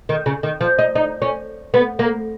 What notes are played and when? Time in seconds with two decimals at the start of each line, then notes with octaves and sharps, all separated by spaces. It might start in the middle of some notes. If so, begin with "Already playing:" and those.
0.09 D#3
0.26 C#3
0.43 D#3
0.61 F3
0.79 D#4
0.96 D#4
1.22 C#4
1.74 B3
1.99 A#3